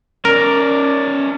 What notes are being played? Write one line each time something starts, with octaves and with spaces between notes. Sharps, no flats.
C#4 A#4 D5